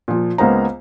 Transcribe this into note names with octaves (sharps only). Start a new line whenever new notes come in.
A#2 F3
C#2 A#3 B3 C5 A#5